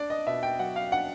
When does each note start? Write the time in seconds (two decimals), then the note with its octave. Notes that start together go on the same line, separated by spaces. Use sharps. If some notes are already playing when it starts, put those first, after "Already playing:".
Already playing: D4 D5
0.10 D#5
0.27 B2 E5
0.43 G5
0.59 F#3 F#5
0.76 F5
0.92 D4 F#5